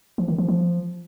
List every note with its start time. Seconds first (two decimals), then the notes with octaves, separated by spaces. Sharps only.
0.18 F3
0.28 D#3
0.38 F3
0.49 F3